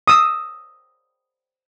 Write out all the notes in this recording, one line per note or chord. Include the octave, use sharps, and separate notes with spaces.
D#6 E6